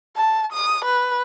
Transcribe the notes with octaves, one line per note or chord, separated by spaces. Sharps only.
A5
D#6
B4